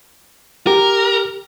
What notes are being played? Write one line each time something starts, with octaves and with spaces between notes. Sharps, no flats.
G4 A#4